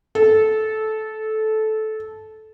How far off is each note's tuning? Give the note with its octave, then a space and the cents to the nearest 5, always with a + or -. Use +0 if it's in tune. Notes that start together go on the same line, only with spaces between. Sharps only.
A4 -15